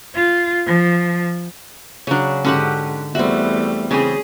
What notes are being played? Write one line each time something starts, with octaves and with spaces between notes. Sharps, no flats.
F4
F3
C#3 F#3 D4 C#5
G#2 D3 C#4 F#4 G4 F#5
E2 G3 A3 C4 F#4 E5
C#3 E3 C4 C#4 G#4